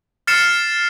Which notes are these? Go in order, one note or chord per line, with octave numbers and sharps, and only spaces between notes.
F6 A6 C7 C#7 E7